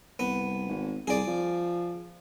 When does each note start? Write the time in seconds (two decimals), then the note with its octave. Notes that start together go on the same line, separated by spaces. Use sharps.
0.19 C2 B3
0.69 G#1
1.07 C2 G#4 D5
1.27 F3